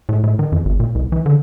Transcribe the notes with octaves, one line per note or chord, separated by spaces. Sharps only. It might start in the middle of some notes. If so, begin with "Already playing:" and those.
A2
A2
D#3
F2
G#1
A#2
C2
E3
D3